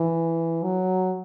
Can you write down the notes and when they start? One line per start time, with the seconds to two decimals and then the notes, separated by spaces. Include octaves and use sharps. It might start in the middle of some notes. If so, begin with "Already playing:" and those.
Already playing: E3
0.63 F#3